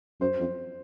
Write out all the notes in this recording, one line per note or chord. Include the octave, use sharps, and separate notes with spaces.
F#2 C5
F2